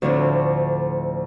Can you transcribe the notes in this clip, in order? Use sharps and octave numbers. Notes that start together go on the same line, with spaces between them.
D2 A2 D3 F3 C4 D4